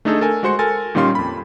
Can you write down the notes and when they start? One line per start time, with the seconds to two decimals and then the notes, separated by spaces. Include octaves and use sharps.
0.05 A3 D4 D#4 G#4 A4
0.21 A4 A#4 G#5
0.43 G#3 F#4 C5 C6 C#7
0.59 A4 A#4 G#5 A6
0.95 A#2 D#3 G3 C#4 F5 C6
1.15 F2 B5